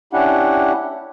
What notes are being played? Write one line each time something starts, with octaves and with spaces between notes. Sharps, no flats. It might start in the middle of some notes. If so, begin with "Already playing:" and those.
C#4 D4 E4 G4 F#5